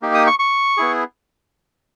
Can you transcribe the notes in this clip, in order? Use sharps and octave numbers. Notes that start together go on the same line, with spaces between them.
A#3 D#4 G4
D#6
C#6
C#6
B3 E4 G#4